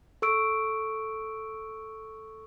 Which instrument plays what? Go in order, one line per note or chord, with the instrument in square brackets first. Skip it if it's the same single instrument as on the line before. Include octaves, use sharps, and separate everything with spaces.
[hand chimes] A4 C#6 E6 D7